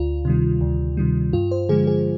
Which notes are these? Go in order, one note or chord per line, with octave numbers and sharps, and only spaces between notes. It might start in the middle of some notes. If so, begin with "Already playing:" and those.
Already playing: D2 F4
C3 D#3 G3
D2
C3 D#3 G3
G2 F4
C5
D3 F3 G#3 G#4
G#4